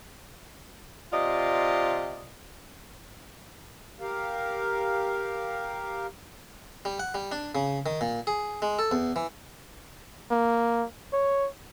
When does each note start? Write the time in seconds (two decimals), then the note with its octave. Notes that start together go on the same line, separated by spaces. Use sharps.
1.12 C3 F4 D5 D#5
4.00 G4 A#4 F5
6.85 G3
7.00 F#5
7.14 G3
7.32 D4
7.55 C#3
7.86 D#3
8.01 A#2
8.27 G#4
8.62 G#3
8.79 A4
8.91 E2
9.16 E3
10.31 A#3
11.13 C#5